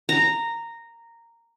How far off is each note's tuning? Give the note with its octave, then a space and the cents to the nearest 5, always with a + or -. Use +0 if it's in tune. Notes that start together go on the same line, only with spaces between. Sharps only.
A#5 -10